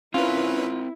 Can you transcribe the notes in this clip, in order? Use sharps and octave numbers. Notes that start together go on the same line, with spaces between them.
C4 C#4 E4 F4 A#4 B4